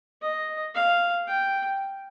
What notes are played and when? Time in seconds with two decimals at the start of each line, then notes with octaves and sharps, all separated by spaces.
0.22 D#5
0.75 F5
1.28 G5